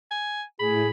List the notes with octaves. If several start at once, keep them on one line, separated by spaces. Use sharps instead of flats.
G#5
A2 G#4 B5